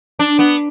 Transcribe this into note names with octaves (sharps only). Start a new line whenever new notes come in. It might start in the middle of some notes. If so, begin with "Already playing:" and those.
D4
B3